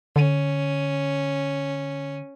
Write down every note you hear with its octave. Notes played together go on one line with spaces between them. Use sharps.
D3 C#4